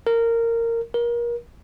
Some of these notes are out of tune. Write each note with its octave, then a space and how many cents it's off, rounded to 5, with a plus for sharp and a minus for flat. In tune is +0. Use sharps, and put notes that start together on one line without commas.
A#4 -15
A#4 +30